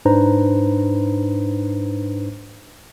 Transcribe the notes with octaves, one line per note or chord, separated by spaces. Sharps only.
G#2 D4 D#4 B4 C5 A#5